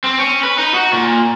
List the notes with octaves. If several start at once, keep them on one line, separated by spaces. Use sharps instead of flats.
C4
C#4
B4
D#4
F#4
A#2